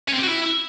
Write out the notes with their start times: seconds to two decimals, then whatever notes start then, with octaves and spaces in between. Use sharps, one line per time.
0.08 C#4
0.13 C4
0.18 G4
0.23 F#4
0.28 E4